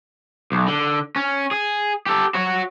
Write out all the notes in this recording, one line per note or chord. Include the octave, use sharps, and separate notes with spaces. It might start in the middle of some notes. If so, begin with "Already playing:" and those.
B1
D3
C#4
G#4
G4 A4
F#4 C#5